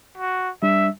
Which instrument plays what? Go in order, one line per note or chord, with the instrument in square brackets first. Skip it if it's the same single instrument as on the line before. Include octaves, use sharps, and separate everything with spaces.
[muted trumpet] F#4
[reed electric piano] G3 D4 [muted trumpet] E5